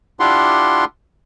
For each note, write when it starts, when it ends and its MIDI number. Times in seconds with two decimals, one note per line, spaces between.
0.20 0.85 62
0.20 0.85 64
0.20 0.85 65
0.20 0.85 67
0.20 0.85 78
0.20 0.85 84